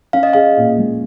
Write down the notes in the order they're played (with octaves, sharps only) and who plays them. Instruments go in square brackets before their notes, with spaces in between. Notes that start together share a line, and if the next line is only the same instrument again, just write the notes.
[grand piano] C#4 [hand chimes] F5
[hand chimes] D#5
[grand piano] G#4 [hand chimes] F5
[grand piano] A#2
G#3